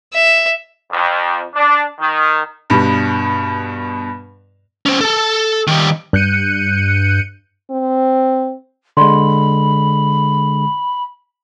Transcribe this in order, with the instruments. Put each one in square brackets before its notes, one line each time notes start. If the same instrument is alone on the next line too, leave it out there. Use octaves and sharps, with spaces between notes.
[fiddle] E5
[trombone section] F2
D4
D#3
[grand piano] G2 B2 G3
[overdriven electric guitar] C#4 C5
A4 A5
D#3 G3
[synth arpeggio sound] G2 F#6 G6 C#7 D#7
[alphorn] C4
[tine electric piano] D3 G#3 [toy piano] D5 C6 [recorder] B5